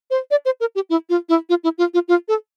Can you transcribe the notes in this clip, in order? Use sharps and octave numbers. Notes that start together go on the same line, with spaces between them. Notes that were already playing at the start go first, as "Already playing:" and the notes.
C5
D5
C5
A#4
G4
E4
F4
E4
F4
E4
F4
F4
F4
A4